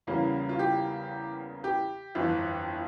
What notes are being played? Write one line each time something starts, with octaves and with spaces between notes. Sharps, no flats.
E2 C#3 E3 G3 A#3 C#4
F4
G4
G4
G1 F2 E3